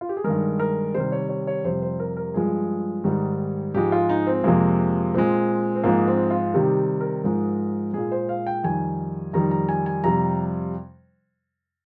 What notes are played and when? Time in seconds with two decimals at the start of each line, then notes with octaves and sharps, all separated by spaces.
0.01 F4
0.09 G4
0.17 G#4
0.24 G2 D#3 G#3 A#4
0.60 A#4
0.94 C3 D#3 G3 C5
1.12 C#5
1.29 C#5
1.47 C#5
1.64 F2 C3 G3 C5
1.82 C5
2.00 A#4
2.17 A#4
2.34 G2 F3 G#3 G#4
3.04 G#2 D#3 G3
3.74 G#2 F3 G#3 G4
3.92 F4
4.09 D#4
4.27 C4
4.44 F2 C3 F3 G#3 A#3
5.14 A#2 G#3 C4
5.76 C4
5.84 G#2 F3 G#3 A#3
6.07 C4
6.30 F4
6.54 C3 D#3 G3 G4
7.01 A#4
7.24 G#2 F3 G#3
7.93 A#2 G#3 G#4
8.12 C5
8.29 F5
8.47 G5
8.64 F2 D#3 G3 G#5
9.33 F2 D#3 G3 A#5
9.51 A#5
9.69 G#5
9.86 G#5
10.04 F2 C3 G3 A#5